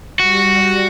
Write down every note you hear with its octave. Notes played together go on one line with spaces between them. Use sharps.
G3 F#4 A#6